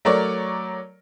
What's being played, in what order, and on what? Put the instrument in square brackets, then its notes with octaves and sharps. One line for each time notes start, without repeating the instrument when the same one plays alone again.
[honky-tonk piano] F#3 A3 A#4 C#5 D5